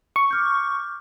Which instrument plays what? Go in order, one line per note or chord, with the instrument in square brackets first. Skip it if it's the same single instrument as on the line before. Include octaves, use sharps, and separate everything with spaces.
[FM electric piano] C#6
[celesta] D6 F6 G6